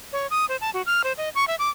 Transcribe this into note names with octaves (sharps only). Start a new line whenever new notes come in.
C#5
D#6
C5
A5
F#4
F6
C5
D#5
C#6
E5
D6